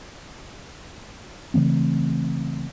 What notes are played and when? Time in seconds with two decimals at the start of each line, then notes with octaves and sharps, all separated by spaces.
1.54 C#3 E3 A3 C4